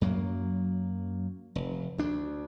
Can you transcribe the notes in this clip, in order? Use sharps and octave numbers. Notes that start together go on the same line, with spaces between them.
F#2 F#3 A#3
F1
D2 D4